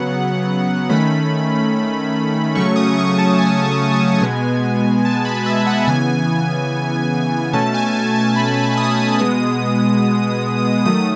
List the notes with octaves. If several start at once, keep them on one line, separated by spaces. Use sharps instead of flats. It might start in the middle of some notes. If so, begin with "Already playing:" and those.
Already playing: C#3 F#3 B3 F#5
D#3 A3 C#4 B5
C#3 F#3 A3 C#4 C#6
D#6
C#6
A5
G#5
B2 G#3 B3
A5
B5
E5
F#5
C#3 E3 B3 G#5
B2 A3 C#4 A5
G#5
G#5
A5
B5
B5
D#6
B2 G#3 B3 D#6
D#3 F#3 A3 D#6